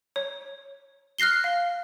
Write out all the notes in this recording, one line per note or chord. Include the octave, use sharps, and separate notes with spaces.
C#5
F6 F#6 A#6 C7 G7
F5